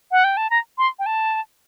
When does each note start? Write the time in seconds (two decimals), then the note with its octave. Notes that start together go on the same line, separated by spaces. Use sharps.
0.11 F#5
0.24 G5
0.37 A5
0.50 A#5
0.78 C6
0.99 G5
1.06 A5